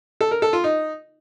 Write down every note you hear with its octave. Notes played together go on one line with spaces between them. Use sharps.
A4
A#4
A4
F4
D#4